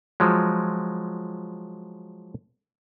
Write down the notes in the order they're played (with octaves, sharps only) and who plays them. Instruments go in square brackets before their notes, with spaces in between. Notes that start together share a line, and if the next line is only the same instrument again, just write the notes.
[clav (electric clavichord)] F3 F#3 G#3